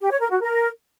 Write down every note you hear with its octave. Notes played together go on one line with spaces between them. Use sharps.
G4
C#5
A#4
F#4
A#4